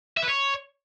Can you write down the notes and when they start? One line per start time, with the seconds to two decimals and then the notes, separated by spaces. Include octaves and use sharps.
0.17 E5
0.22 B4
0.28 C#5